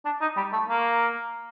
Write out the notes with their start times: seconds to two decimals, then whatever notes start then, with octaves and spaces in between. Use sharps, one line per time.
0.05 D4
0.21 D#4
0.37 G3
0.53 A3
0.69 A#3